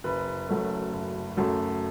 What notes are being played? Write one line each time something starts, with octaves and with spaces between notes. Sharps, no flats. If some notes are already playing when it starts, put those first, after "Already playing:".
F#1 B4
F#2 F#3 A3
F#1
F#2 F#3 A3